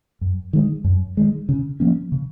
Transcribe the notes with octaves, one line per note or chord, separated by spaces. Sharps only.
F#2
D#3 G#3
F#2
D#3 G#3
C#3
F3 A#3 C#4
C#3